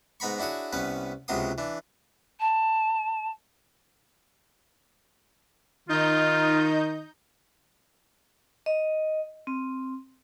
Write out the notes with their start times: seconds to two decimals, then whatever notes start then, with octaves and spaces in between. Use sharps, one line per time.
0.20 G#2 B3 A#5 B5 C#6
0.39 D4 E4 F#4 G#4 C#5
0.73 C2 B3 C#4 B4
1.28 C#2 C3 F#3 B3 C6 D#6
1.58 E3 D4
2.40 A5
5.89 D#3 D#4 F4 D#5 G6
8.66 D#5
9.47 C4